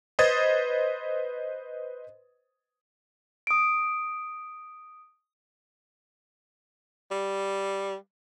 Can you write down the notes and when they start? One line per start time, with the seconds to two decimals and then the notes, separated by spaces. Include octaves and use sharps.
0.19 B4 C5 D#5 D#6 G#6 A6
3.47 D#6 D7
7.11 G3